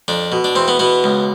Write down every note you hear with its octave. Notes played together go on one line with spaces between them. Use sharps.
F2 D4
B2
D4
E2 C4
B3
B2 B3
C#2